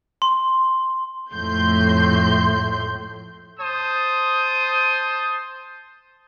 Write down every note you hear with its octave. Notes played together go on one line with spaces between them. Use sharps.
C6
F2 A2 A3 C6 G6
C5 A5 D#6